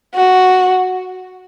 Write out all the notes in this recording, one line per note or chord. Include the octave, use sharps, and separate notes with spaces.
F#4